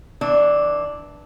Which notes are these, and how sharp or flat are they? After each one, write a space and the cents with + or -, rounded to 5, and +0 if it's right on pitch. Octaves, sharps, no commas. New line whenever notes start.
E3 -25 D4 +0